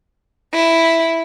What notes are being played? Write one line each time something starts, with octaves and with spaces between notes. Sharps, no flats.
E4